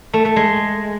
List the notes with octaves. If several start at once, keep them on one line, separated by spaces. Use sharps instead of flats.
A3
A3
G#3